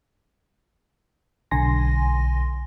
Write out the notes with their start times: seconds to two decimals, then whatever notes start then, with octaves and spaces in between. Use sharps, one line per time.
1.51 B1 D3 G#5 C6 A#6